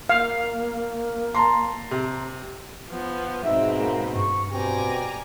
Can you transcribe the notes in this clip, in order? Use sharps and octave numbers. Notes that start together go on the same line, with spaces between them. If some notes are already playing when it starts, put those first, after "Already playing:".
A#3 F5
A5 A#5 C6
C3
F3 B3
G#2 B2 G#3 C4 D#4 E5
A#3
G2 C#6
B2 C4 G4 D5 G5 G#5 A#5